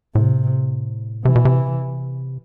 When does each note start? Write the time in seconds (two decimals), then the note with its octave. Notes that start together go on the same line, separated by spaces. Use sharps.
0.15 A2 C3
1.25 C3 E3
1.35 B2
1.45 C3